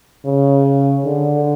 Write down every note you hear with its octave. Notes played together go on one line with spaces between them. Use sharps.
C#3
D3